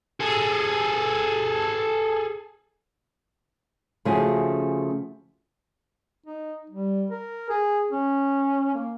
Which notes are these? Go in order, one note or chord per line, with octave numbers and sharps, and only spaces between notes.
G#4 A4
C#3 F3 A3 F#4 G#4
D#4
G3
A#4
G#4
C#4
A#3